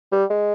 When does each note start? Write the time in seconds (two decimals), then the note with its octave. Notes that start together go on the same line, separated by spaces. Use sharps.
0.12 G3
0.30 G#3